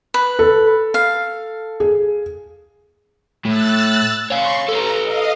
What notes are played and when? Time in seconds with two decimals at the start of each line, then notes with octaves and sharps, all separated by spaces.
0.14 B4
0.39 A4
0.94 F5
1.80 G#4
3.45 A2 E6 F#6 A6
4.30 C#5 F5 C6 C#6
4.68 A4 B4 A#5
5.04 D#5 F5